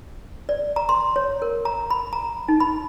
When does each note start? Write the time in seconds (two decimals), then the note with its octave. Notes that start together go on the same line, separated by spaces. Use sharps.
0.49 D5
0.76 A#5
0.89 C6
1.16 C#5
1.42 A#4
1.65 A#5
1.90 B5
2.13 A#5
2.48 D#4
2.60 B5